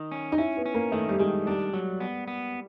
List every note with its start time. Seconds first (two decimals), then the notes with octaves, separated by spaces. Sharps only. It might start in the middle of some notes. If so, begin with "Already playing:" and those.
Already playing: D#3
0.12 C#4
0.32 D#4
0.38 C#4 E4
0.57 B3
0.66 C#4
0.74 A#3
0.92 D#3 A3
1.09 G3
1.20 D#3 G#3
1.47 G3 D4
1.73 F#3
2.00 B3
2.28 B3